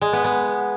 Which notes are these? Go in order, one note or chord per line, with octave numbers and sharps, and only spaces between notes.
G#3
B3
B3